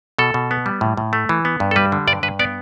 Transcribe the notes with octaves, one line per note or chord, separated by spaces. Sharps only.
B2 A4
B2
B3
G3
A2
A2
A3
E3
B3
G2
A4
G3 B4
D3
G2 D5
G2 B4
B3 D5